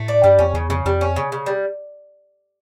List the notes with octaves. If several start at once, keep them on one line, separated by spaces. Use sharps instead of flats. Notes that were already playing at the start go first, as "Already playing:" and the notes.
Already playing: A2 A3
D5
G2 G3
F2 C#4
E2 C#3
F2 C#3
F2 G3
C#4
C#3
C#3
G3